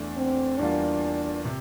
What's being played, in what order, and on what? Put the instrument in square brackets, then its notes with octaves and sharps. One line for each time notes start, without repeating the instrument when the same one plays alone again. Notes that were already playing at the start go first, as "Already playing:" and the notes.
Already playing: [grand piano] E2 E3 A3 D4
[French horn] C4
[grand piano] E2 E3 G3 A#3 F4 [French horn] D4
[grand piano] C3